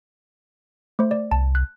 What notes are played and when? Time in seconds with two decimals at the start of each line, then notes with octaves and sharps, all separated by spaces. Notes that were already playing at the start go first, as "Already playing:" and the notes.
0.99 A3 C5
1.11 D5
1.31 C2 A5
1.55 F#6